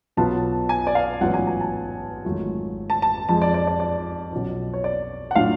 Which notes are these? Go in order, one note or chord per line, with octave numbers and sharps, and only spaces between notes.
B1 B2 F#3 B3 F4 A5
G#5
D5
F5
A1 G#2 F#3 B3 F4 F#5
G#5
G#5
A5
G#1 G#2 F#3 A3 F4
A5
A5
F2 F3 G#3 A5
D5
D5
D5
D5
B1 B2 F#3 C#4 F4
C#5
D5
F#5
A2 F#3 A3 D4 F4 F5